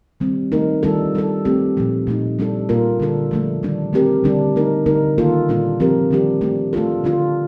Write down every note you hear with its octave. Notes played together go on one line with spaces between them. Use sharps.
D#3 G3 C4
D#3 A3 D#4 A#4
D#3 G3 D4 F4 A4
G3 D4 A4
A3 C4 G4
A#2 F3 A3
A#2 A3 D#4
G3 D4 A4
A#2 G3 A#3 F4 A#4
D3 G3 D4 A4
F3 A3 D4
D#3 G3 D4
A3 C4 G4 A#4
D3 G3 D4
A3 D#4 A#4
D3 A3 D#4 A#4
D#3 A#3 F4 A4
A#2 G3 A#3 D4 F4
F3 C4 G4 A#4
D#3 G3 D4 G4
A3 D4 G4
A3 D4 F4 A4
D3 A3 D4 F4